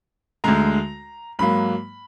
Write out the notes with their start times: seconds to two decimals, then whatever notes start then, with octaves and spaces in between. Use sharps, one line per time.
0.44 D2 D3 G#3 A#5
1.39 G#2 F#3 A#3 B5